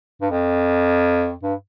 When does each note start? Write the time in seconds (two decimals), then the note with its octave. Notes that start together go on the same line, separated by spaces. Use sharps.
0.22 G2
0.30 F2
1.43 G2